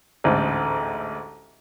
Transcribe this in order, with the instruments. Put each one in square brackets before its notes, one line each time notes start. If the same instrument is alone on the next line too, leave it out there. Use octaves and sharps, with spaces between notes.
[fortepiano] A1 D2 G#2